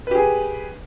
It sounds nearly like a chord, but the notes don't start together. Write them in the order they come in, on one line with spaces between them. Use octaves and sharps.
B4 G4 G#4